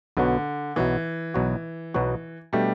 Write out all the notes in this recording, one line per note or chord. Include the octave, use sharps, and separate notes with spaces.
B1 B2 D3 F#3 B3 F#4
B1 B2 E3 F#3 B3 F#4
B1 B2 F#3 B3 F#4
B1 B2 F#3 B3 F#4
B2 G3 A3 D4 G4